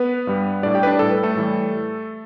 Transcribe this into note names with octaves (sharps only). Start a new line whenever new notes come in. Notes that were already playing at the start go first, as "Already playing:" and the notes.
Already playing: B3 B4
G2 G3
A2 G3 D4 D5
G4 G5
B4
D4 D5
A2 G3 A4
B4
A3 A4
A2 E3 G3